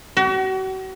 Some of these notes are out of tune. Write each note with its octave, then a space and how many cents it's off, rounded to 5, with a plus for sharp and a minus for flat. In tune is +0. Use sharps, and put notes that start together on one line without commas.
F#4 +40